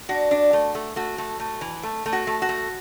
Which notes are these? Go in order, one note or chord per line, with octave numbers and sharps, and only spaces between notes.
D4 F#4
D4
A3
A3
A3 F#4
A3
A3
E3
A3
A3
F#4
A3
F#4
A3